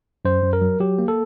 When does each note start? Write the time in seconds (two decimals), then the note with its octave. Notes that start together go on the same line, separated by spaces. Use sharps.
0.25 F#2 C5
0.43 F#2
0.53 A#4
0.62 F#3
0.80 F#3 G4
0.99 A#3
1.08 A4